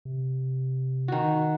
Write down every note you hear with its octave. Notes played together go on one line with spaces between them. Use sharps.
C3
D#3 F#4